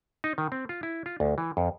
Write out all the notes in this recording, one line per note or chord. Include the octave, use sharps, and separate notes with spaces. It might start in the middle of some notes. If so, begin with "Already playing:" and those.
D#4
D#3
C4
F4
E4
F4
D2
E3
F2